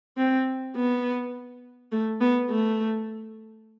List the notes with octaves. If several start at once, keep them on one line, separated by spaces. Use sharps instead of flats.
C4
B3
A3
B3
A3